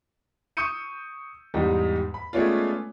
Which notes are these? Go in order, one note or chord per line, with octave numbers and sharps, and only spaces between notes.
C#6 D#6 E6 G6 C#7 D#7
E2 G#2 G3 D#4
B5
G#3 A3 B3 C#4 D4 F4